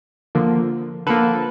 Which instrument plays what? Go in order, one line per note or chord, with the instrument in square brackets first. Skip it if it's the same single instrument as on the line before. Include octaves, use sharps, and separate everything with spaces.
[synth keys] D3 F3 A#3
D3 F3 A#3 A4 B4